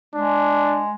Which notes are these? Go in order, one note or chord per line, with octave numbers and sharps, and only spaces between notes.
G#3 D4